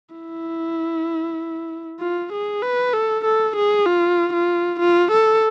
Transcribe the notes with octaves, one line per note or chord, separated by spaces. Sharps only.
E4
F4
G#4
B4
A4
A4
G#4
F4
F4
F4
A4